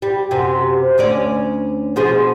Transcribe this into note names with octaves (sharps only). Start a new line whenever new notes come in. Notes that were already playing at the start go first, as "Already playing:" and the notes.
G3
F#2 C3
D2 C#4 D5
B2 F3 G#4